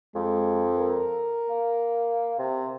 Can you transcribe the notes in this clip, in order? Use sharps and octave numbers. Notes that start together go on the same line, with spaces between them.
F2 G#3
A#4
A#3
C3